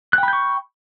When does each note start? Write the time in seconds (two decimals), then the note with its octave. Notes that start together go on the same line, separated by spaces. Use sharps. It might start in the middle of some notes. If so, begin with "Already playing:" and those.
0.13 F#6
0.18 G5
0.23 B5
0.28 G6
0.33 C#6